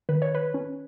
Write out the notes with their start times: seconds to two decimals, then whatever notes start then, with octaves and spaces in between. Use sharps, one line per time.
0.09 D#3 B4
0.22 C#5
0.35 B4
0.54 C#4